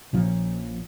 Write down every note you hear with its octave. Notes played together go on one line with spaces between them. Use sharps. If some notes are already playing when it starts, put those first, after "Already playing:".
A#1 A#2 F3 C#4